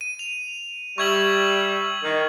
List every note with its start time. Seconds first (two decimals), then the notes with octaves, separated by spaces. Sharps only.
0.01 D#7
0.19 F7
0.98 G3 E5 C#6 G#6 F#7
2.03 D#3